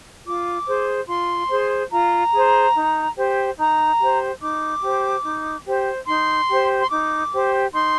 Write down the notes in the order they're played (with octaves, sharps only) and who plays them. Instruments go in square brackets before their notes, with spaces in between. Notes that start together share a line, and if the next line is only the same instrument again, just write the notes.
[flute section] F4 D6
G#4 C5
F4 C6
G#4 C5
F4 A#5
G#4 C5
D#4
G4 C5
D#4 A#5
G4 C5
D#4 D6
G4 C5
D#4
G4 C5
D#4 C6
G4 C5
C6
D#4 D6
G4 C5
D#4 C6